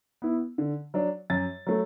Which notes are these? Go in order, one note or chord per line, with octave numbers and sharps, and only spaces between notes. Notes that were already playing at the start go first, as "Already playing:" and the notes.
B3 E4
D3
F#3 D4
F#2 A6
F#3 A3